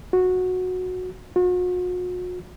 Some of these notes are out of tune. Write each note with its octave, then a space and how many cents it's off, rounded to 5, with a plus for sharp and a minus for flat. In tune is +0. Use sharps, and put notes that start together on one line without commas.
F#4 -10
F#4 -40